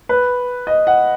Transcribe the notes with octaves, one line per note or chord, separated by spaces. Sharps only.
B4
D#5
F#5